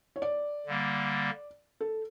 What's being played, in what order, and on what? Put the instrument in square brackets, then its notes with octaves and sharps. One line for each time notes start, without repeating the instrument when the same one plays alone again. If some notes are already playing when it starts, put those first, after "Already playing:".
[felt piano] C#5
D5
[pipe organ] D3 G3 A#3
[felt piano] A4